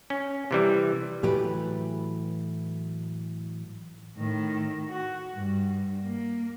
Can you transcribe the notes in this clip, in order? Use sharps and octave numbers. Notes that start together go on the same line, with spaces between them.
C#4
C3 E3 G3
A2 E3 F#3 A3 G4 B4
A2 D#3
F#4
G2
A#3